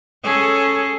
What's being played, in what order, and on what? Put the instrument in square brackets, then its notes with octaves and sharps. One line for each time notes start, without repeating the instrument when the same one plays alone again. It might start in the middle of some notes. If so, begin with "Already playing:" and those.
[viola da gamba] C#4 G#4 A4